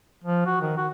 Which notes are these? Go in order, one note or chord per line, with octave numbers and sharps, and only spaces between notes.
F3
F#4
D#3
F#4